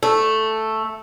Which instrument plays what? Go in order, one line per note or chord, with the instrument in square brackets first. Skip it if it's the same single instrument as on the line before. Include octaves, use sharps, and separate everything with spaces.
[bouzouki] A3